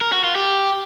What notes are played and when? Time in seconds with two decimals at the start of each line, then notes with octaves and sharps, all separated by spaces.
0.01 A#4
0.13 F#4
0.24 F4
0.35 G4